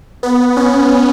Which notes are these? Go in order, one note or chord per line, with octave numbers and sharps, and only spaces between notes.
B3
C#4